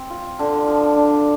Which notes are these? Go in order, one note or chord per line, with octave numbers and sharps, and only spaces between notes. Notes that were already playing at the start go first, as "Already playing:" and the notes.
Already playing: C4
F4
D3
F3
D4